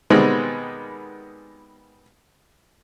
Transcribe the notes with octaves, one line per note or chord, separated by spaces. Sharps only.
B2 D#3 G3 G#3 B3 C4